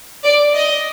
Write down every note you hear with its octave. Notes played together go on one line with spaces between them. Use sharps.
D5
D#5